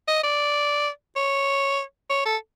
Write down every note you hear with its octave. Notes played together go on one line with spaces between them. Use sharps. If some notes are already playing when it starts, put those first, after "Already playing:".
D#5
D5
C#5
C#5
A4